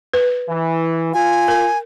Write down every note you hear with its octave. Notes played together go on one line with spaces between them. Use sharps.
B4
E3
F4 G#5
A#4